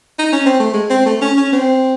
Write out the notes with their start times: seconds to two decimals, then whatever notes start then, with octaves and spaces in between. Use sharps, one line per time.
0.19 D#4
0.33 C#4
0.46 C4
0.60 A3
0.74 G#3
0.90 C4
1.06 A3
1.21 C#4
1.37 C#4
1.53 C4